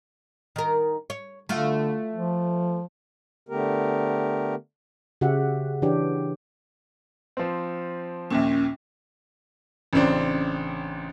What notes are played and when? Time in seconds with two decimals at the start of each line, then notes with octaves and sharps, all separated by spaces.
0.56 D#3 A#4
1.10 C#5
1.49 D3 A3 F4 F#4
2.14 F3
3.49 D3 A3 B3 G4 A#4
5.21 C#3 F#4 G4 E5 F#5
5.82 E3 D4 G4 C#5
7.37 F3 C4
8.30 A#1 D#2 A#2 C#4
9.93 A1 C#3 C4 D4